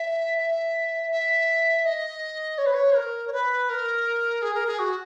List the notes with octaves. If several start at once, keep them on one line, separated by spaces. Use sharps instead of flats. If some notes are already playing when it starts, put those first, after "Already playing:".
Already playing: E5
E5
E5
D#5
C#5
B4
C#5
A#4
C#5
B4
A#4
G#4
A#4
G#4
F#4